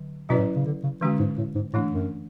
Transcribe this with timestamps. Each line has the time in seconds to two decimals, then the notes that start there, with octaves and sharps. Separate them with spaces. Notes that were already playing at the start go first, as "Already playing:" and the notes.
Already playing: D3 F#3
0.29 B2 F#3 C#4 E4 B4 D5
0.38 A2
0.56 C#3
0.66 D3
0.83 C#3
1.01 D3 E3 G#3 C#4 F#4
1.20 G#2
1.38 A2
1.55 G#2
1.73 A2 E3 A3 D4
1.92 F#2